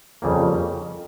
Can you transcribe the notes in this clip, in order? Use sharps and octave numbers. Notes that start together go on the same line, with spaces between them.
F2 C#3 G3 A#3